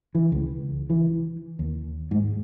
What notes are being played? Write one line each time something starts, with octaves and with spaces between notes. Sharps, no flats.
E3
C#2
E3
D#2
G#2